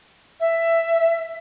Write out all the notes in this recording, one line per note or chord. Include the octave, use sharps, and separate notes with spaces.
E5